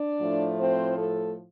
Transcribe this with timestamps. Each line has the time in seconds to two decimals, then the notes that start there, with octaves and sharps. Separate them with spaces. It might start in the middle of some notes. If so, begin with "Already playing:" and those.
Already playing: D4 D5
0.20 A2 F3 A3
0.60 C4 C5
0.98 A3 A4